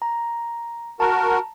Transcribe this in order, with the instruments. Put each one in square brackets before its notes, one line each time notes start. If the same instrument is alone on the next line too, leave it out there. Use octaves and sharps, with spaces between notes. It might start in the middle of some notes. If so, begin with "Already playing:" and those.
[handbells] A#5
[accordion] F#4 A#4 [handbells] A5 A#5